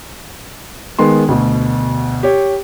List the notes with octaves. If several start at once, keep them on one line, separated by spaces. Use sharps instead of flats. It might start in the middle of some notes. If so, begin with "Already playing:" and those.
D#3 G#3 B3 C6
D2 B2
G4 C#5